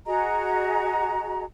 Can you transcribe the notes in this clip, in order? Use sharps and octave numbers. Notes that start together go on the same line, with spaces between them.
F#4 G#4 D#5 A#5